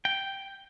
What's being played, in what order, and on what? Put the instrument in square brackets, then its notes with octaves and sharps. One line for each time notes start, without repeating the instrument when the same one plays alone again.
[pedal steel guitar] G5